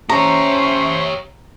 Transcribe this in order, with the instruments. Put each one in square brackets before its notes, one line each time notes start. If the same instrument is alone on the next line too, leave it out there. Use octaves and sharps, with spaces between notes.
[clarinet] C#4 [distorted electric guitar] G4 C#5 [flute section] C5 E5 C#6 [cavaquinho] A#5